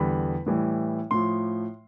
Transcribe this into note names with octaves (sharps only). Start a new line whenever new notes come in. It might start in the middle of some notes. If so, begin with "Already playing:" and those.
Already playing: E2 D3 G3 B5
A2 E3 G3
A2 F3 C6